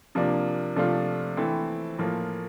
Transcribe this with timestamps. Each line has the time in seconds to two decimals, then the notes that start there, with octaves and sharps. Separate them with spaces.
0.15 C3 F3 A#3 D4
0.76 C3 F3 A3 D4 F4
1.37 E3 A3 C4 E4
1.98 A2 F3 A#3 F4